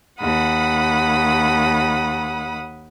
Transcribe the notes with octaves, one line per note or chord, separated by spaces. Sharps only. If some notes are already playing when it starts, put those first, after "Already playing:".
D#2 F#5 B5 D#6